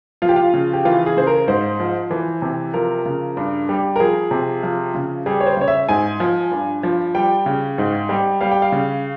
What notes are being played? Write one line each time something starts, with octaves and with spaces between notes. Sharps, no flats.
F3 F4
G4
F4
C#3
G4
E3 F4
G#4
C#3 C5
A#4
G#2 C5
F3
E3
C3
F3 A#4
C#3
G2
G3
A#4
F3 G#4
C3
F3
C#3
G3 G#4
C#5
C5
C#3 C#5
E5
G#2 G#5
F3
G2
F3
G3 G5
C#3
G#2
G3
G3 F5
G5
F5
C#3